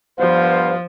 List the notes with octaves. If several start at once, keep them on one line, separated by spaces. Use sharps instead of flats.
G2 F3 B3 C5 F5